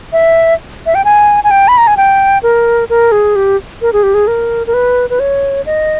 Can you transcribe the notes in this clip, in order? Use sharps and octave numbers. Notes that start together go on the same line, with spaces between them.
E5
E5
G5
G#5
G#5
G5
B5
A#5
G#5
G5
A#4
A#4
G#4
G4
A#4
G#4
G4
G#4
A#4
A#4
B4
B4
C#5
D#5